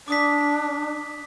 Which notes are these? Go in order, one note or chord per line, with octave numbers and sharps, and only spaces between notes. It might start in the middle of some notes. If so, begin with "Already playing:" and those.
D4 D6 D#6 B6